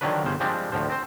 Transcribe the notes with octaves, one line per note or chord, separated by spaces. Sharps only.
D3 D#3 F3 F#3 D4 B4
G1 C#3 C5
F3 G3 G#3 C4 D4
D2 A2 F3 C5
C4 C5